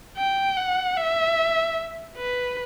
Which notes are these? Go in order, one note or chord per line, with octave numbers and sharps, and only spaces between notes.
G5
F#5
E5
B4